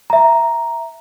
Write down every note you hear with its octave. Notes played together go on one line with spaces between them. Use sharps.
E5 A#5